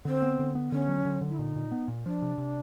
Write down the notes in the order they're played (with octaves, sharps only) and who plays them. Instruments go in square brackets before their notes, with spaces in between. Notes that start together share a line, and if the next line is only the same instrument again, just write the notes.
[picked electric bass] D3 [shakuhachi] C4
[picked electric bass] B3
D3
B3
[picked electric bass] D3 [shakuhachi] C#4
[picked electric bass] F#3
D3
D3
[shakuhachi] E4
[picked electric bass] A#2 [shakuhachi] D#4
[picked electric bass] A#2
B3
A#2
[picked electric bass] F3 [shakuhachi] D4
[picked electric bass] C3
C3